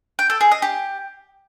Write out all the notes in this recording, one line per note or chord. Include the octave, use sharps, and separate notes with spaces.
G5
A4
G#4
D#5
G4